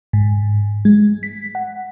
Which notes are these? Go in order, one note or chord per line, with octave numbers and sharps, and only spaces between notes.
G#2
G#3
B6
F#5